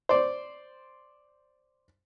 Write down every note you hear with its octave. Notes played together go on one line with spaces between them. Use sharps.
C5 D5